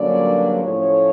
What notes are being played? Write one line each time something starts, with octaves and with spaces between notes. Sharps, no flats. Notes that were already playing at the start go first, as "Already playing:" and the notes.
Already playing: G2 D3 F#3 A#3 C#4 D5
A2 F3 A3 C#4 C#5